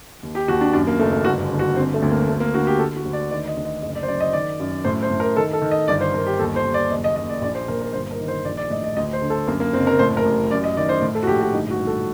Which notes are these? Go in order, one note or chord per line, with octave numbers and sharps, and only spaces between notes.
D#2
G4
D#2 F#4
D4
F#2 D4
A#3
F#1 A3
A#3
G1 F#4
D3
F#4
D3 C4
A3
D2
A#3
D2 A3
A#3
D3 F#4
G4
D3 A4
F#4
D2
D5
D#3 D5
D#5
D2
D#5
F#1 D#5
D5
C5
F#2 D5
D#5
D#3 D5
F#2
A2 C5
C5
A2
A#4
D#3 A4
A4
D#3
D#5
G1 D5
C5
G1 A#4
G4
D#2 A4
C5
D#2
D5
F#1 D#5
D#5
F#1 D#5
D5
A#1 D5
C5
A#2 A#4
A#4
G1 C5
A#4
D#3
C5
A#1 D5
D5
A2 D#5
D#5
D2 D#5
C5
D3
A4
F#2 A#3
A#3
F#1 C4
A#4
A2 C5
A#4
A1
F#2 D5
D#5
D#3 D5
C5
A2
A4
F#4
A#1 G4
F#4
G1 D#4
F#4
G1
A4